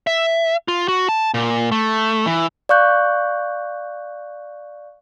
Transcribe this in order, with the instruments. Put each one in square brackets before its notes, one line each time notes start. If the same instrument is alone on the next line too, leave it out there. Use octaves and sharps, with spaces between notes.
[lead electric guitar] E5
F4
F#4
A5
A#2
A3
E3
[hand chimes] D5 F5 C#6 F#6 G6